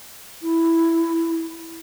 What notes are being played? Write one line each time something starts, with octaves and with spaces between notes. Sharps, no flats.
E4